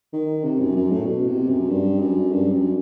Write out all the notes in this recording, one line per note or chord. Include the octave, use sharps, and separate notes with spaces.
D#3
C3
F#2
F#2
A2
B2
C3
F#2
G2
F#2
G2
F#2